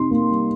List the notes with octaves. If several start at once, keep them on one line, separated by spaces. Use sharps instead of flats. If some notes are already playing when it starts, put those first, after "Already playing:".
Already playing: C3 D#4 C6
A#3
G3